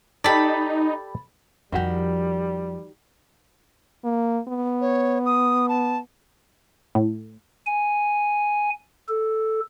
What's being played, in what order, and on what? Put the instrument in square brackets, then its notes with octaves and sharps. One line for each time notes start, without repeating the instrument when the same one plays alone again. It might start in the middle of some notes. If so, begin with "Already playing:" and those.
[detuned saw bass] D#4 [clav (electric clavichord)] G4 A4 D5 [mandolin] A5 B5
[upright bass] F2 F3 [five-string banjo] D#3 F#4 G4 [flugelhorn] G3
[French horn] A#3
B3
[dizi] C#5
D#6
A5
[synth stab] A2
[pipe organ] G#5
A4